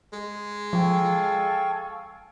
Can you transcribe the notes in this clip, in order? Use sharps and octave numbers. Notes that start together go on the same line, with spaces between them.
G#3
F3 A4 F5 G5 G#5 C#6